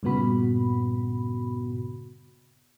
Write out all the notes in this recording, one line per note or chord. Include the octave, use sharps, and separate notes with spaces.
G2 A#2 C#3 B3 F#4 B5